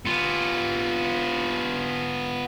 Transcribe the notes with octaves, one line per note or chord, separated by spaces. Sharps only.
B3 F4